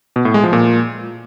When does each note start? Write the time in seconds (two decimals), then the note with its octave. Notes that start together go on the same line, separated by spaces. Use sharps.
0.16 B2
0.25 A2
0.34 G#3
0.44 F3
0.53 A#2